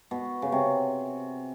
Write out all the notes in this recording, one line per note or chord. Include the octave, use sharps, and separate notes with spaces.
B2
C#3
C3